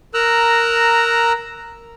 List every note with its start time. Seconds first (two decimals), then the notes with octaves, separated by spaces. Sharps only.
0.14 A#4 A#5 E6 F#6